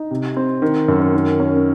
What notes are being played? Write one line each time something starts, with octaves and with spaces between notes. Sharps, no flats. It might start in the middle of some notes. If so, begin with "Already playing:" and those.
Already playing: D#4
C3
C4
D#3
F#2
D#3
C#4